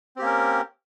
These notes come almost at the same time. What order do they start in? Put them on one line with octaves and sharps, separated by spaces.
C4 G4 A#3 C#4 A#4